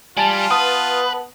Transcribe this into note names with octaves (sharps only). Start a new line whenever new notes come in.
G3 F4 G#5 A5
B3 B4 A5 D#6